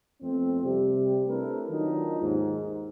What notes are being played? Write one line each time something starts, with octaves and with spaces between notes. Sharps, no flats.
F2 A3 B3 C4
C3 G3 G4
A3 C4 D4 E4 A#4 B4
D#3 F#3 D4 D#4 F4
D#2 G#2